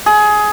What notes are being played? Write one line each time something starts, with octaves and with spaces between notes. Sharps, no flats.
G#4